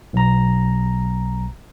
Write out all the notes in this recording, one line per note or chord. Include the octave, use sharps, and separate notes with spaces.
B1 A#5